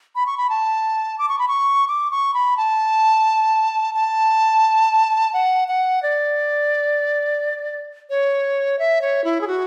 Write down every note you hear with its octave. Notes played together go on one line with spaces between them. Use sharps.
B5
C#6
B5
A5
D6
C#6
B5
C#6
D6
C#6
B5
A5
A5
F#5
F#5
D5
C#5
E5
C#5
E4
G#4
F#4